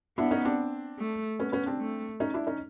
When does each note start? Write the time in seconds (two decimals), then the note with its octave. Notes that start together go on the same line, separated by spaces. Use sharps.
0.18 B3 D4 E4
0.31 C#4 D#4
0.45 C4 D4
0.99 A3
1.40 B3 C#4
1.52 B3 C#4
1.66 C4 D4
1.80 A3
2.20 C#4 D#4
2.34 D4 E4
2.47 C#4 D#4